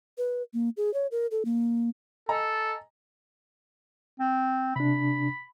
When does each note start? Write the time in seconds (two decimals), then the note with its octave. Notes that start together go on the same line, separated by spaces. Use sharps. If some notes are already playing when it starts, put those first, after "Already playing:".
0.18 B4
0.54 A#3
0.77 G#4
0.94 C#5
1.11 A#4
1.31 A4
1.45 A#3
2.29 A4 D#5 G#5 A#5
4.20 C4
4.76 C3 D4 B5